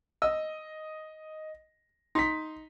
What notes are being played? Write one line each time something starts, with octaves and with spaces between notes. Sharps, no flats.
D#5 E6
D#4 C6 B6